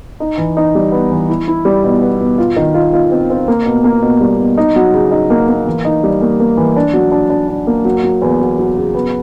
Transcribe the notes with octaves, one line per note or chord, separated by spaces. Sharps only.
D#4
E3
D#4
G3
B3
E3
E4
E4
G3
B2
B3
B2
F4
D#3
F4
F4
C4
C4
A#3
B2
A#3
B2
G3
B2
D#4
F#3
C#3
D#4
A#3
A#3
E3
D#4
G3
A#3
A#3
E3
D4
F#3
D4
D4
D4
A#3
F#3
F#3
E2
F#3
F#3
C#3
B3